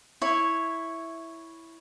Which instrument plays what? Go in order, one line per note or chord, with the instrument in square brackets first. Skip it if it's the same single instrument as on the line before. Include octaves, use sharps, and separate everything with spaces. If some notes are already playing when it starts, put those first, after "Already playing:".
[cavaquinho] E4 C#5